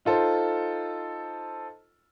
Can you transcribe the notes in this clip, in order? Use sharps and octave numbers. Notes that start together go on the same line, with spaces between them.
D#4 F4 A4 C5